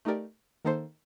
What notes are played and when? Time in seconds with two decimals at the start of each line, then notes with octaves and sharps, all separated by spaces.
0.05 A3 D#4 G4 A#4 D5
0.65 D#3 A#3 D#4 A4 C5